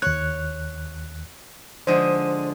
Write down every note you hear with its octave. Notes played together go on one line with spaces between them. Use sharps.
D#2 C#5 F#6
D3 F3 G#3 C5